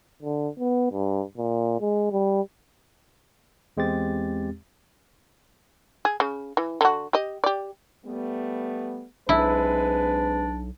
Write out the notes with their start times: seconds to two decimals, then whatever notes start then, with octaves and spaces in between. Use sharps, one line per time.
0.23 D3
0.59 B3
0.92 G2
1.37 A#2
1.81 G#3
2.11 G3
3.77 E2 G#3 C4 G4 A6
6.05 G#4
6.20 C#3
6.57 E3
6.81 D3 F#4
7.13 G4 D#5
7.44 G4 D5
8.05 G3 A3 B3
9.29 B1 G#3 C4 D4 E4 B4